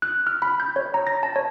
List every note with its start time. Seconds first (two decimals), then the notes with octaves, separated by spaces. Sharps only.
0.02 F#6
0.27 F6
0.42 B5
0.60 G6
0.76 C#5
0.94 A#5
1.07 A#6
1.23 A5
1.36 C#5